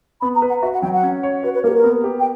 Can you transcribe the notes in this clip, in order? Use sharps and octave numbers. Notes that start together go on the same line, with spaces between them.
B3 B5
A#5
B4
F#5
F#4 E5
F#5
F#3 G5
F#5
C#4
C#5
F#4 B4
B4
A#3 A#4
G4
A#4
B3
G4
G5